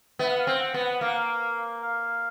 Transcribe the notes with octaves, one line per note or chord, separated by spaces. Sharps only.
B3 E5
F#5
F5
C4
F#5
B3
F#5
A#3 F5
F#5
F5
F5